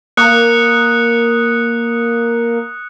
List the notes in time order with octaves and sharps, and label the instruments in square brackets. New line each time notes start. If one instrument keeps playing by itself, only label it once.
[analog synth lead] A#3 [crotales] D#6 F#6 C#7